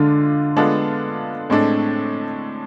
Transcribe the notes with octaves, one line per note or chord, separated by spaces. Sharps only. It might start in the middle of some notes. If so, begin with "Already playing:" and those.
Already playing: D3 G#3 D4 F4
G#3 B3 D4 F4 A4
A2 G#3 C4 D4 A4